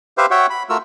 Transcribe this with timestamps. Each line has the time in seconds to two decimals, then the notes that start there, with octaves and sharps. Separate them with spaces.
0.18 G4 B4 C5 E5 F5
0.31 F#4 C#5 E5 F#5 G5
0.50 B5
0.69 A3 F4 F#4 A#4 E6